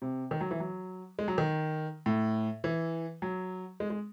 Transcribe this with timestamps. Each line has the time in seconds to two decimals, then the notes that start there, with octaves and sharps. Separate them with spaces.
0.02 C3
0.31 D#3
0.41 F#3
0.51 E3
0.60 F#3
1.19 G#3
1.28 F#3
1.38 D#3
2.06 A2
2.64 E3
3.22 F#3
3.80 G#3
3.90 G#3